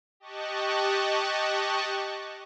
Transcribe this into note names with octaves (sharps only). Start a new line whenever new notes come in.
G4 D#5 A5 C#6 F#6